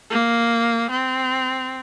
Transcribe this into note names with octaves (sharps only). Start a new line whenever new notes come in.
A#3
C4